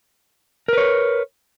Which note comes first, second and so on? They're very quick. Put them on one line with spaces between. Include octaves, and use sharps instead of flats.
A#4 B4 C#5